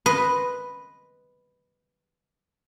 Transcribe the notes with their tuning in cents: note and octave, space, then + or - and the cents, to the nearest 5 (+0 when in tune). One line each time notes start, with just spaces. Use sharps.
B4 +0 D#5 +0 C6 +0